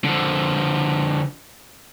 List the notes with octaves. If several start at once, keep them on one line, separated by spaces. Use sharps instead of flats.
D3 F3